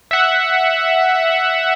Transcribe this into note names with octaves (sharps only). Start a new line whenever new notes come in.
E5 F#5